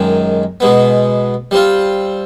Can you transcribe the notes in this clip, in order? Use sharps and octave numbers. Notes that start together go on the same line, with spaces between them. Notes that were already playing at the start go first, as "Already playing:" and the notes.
Already playing: F#2 D#3 G#3
B2 G#3 B3
G3 C4 F4